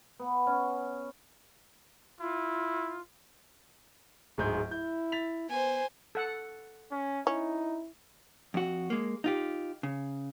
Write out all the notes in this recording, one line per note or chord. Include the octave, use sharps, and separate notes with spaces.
B3
C#4
E4 F4
D1 G#2 G#4 G6
E4 G6
A6 B6 F7
B3 C5 G#5
A4 F#5
C#4
C#4 D#4 E4
F2 F#4
G#3 A#3
D#4 F4 G4
C#3